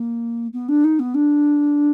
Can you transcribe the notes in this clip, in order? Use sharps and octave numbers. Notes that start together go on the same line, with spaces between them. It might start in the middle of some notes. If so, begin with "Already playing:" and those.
Already playing: A#3
B3
D4
D#4
B3
D4